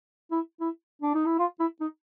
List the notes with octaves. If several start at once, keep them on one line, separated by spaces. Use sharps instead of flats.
E4
E4
D4
D#4
E4
F4
E4
D#4